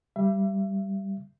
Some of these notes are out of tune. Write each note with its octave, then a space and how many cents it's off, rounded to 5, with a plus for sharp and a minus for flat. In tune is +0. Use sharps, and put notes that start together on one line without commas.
G3 -5 E5 +35